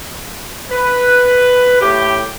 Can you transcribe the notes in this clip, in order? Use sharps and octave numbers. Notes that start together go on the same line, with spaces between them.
B4
A2 G4